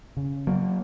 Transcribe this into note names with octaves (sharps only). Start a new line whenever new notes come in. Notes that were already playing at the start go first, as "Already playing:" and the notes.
C#3
F#3 A#3